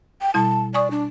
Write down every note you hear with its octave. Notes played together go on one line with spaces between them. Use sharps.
G5
B2 G3 E4 A5
D5 G#5 C#6 D#6
D4